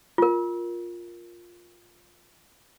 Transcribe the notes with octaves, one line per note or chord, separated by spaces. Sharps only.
F4 A#4